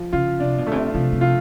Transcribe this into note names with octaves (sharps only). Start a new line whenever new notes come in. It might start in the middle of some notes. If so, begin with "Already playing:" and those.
Already playing: F3
C#3 F4
C3 D4
B2
C#3 A3
C3
C3 F3
C3
F4